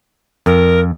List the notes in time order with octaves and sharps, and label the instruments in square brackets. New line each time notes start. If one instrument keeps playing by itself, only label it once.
[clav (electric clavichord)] F2 [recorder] A#4